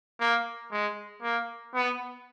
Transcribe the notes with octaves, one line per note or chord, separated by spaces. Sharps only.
A#3
G#3
A#3
B3